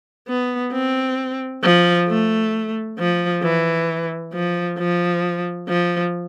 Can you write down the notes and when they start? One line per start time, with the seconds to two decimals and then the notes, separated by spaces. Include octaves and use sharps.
0.28 B3
0.73 C4
1.63 F3
2.08 A3
2.99 F3
3.43 E3
4.33 F3
4.78 F3
5.68 F3